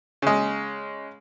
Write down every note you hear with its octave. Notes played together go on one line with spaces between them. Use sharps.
C#3 G#3